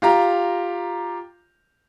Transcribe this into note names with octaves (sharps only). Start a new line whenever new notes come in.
F4 G4 A#5